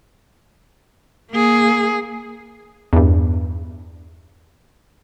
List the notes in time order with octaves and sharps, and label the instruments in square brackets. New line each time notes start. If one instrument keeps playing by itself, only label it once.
[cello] A#3 G#4
[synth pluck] E2 G2